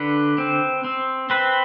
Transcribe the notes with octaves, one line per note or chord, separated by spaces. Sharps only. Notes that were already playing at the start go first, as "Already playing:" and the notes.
Already playing: D3 B4
C4
C4
C4 B4